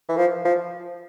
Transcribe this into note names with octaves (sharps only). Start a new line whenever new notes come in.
E3
F3
F3